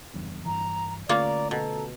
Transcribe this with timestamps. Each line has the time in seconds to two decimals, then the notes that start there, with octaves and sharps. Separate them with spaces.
0.14 F#1 E2 G2
0.45 G2 E3 A#5
1.09 D3 A3 A#3 C#4 F4 C#5 D5 A#5
1.51 B2 A4